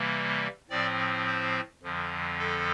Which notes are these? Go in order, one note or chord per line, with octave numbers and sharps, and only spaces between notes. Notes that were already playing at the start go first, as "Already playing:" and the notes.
Already playing: C3 E3 G3 A#3
A2 F3 C4 D5
C5
F2 D3 F3
A4